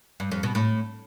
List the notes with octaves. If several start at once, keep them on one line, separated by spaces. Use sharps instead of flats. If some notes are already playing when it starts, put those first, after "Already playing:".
G2
F2
B2
A2